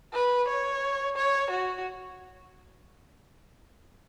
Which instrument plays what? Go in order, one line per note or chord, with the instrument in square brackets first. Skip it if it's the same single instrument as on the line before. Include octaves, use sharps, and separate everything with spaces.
[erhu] B4
C#5
C#5
F#4